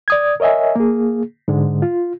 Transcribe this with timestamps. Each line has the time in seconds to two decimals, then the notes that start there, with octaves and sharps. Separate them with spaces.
0.08 D5 D#6 G#6
0.40 A#4 C#5 D#5 E5 G#5
0.76 A#3 G#4
1.48 G#2 D3 G#3
1.82 F4